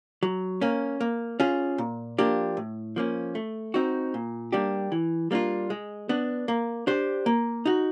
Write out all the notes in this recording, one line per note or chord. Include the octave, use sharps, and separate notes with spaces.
F#3
A#3 C#4
A#3
C#4 F4 G#4
A#2
F3 A#3 D4 G4
A2
F3 A#3 C#4
A3
C4 D#4 F#4
A#2
G3 A#3 D4 G4
E3
G3 A#3 D4 F4
G#3
B3 D4
A#3
D4 G4 C5
A#3
D#4 F#4